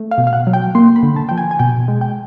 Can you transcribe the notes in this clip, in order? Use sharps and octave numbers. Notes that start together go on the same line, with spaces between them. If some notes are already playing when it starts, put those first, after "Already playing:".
Already playing: A3
F5
B2
F5
F#5
F#3
G5
A#3 C6
B5
D3
A5
F3 G5
G#5
G#5
B2 G5
G#3
G5